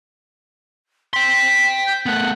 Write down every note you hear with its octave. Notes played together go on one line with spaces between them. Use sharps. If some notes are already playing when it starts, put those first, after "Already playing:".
G5 C6 B6
G6
A3 B3 F#5